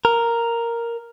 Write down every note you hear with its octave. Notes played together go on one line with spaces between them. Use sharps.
A#4